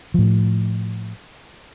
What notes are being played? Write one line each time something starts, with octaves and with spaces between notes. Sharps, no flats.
A2 F3